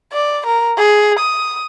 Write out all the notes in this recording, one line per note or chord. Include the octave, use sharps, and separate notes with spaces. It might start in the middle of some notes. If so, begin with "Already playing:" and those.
D5
A#4
G#4
D#6